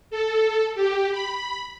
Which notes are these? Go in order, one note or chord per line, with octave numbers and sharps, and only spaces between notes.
A4
G4
B5